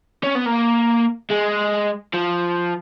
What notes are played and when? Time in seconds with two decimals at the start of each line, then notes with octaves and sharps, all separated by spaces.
0.24 C#4
0.35 B3
0.46 A#3
1.30 G#3
2.14 F3